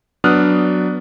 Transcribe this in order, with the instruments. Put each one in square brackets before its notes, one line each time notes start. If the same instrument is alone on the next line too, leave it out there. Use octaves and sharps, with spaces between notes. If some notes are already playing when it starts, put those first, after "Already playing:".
[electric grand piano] F#3 B3 D4 D#6 F6 F#6